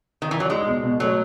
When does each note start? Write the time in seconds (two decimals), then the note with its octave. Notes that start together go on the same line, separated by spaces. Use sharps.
0.22 D#3
0.31 E3
0.40 F#3
0.50 G#3 D#4
0.67 B2
0.83 B2
1.00 F#3 A3